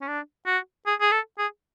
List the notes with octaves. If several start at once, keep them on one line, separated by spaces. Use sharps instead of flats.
C#4
D4
F#4
G#4
G#4
A4
G#4